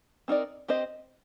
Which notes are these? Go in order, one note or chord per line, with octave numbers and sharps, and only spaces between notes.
C4 D#4 A#4 D5
C4 G4 C5 D#5